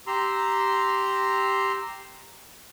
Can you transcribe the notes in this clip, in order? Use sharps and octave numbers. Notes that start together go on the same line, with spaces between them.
G4 A#5 C6 E6